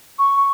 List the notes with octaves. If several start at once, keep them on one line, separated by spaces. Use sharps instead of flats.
C#6